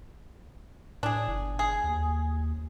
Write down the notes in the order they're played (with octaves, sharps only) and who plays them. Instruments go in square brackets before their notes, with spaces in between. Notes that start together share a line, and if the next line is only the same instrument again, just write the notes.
[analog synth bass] A2 [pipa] D4 G#4
[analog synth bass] G1
[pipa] G#4
[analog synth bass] D#2